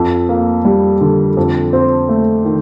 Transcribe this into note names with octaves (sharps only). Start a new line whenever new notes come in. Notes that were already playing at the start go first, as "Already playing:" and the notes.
Already playing: F2
A#3
G3
D3
F2
C4
A3
D#3